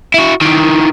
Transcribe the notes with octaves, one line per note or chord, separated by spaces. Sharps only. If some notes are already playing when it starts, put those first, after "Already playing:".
E4 F#4
D#3 E3